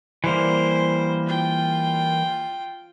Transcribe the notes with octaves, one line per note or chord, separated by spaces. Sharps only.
E3 G3 A#3 C5
F4 G5